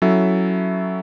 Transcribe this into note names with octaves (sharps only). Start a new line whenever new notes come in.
F#3 C#4 E4 A4 E5